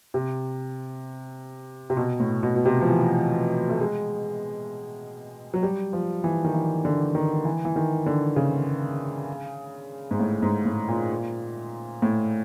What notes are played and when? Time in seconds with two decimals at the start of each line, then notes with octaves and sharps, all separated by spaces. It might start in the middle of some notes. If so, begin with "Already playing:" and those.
0.14 C3
1.90 C3
1.97 B2
2.20 A2
2.43 B2
2.56 B2
2.65 C3
2.81 F3
2.88 E3
3.69 A3
3.80 G#3
5.54 F#3
5.63 G3
5.93 F3
6.24 E3
6.44 D#3
6.54 E3
6.85 D3
7.15 D#3
7.45 E3
7.65 E3
7.76 D#3
8.06 D3
8.36 C#3
10.11 G#2
10.19 A2
10.43 G#2
10.65 A2
10.88 A#2
12.02 A2